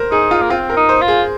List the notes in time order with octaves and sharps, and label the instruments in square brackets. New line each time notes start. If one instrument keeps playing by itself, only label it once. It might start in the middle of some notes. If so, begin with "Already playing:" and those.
Already playing: [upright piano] A#4 C5
[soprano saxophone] D#4 [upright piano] G#4
[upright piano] F4
[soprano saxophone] A#3
[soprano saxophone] C4 [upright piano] F4
[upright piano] A#4
[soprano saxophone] D#4
[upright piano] C5
[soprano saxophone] F4
[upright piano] G#4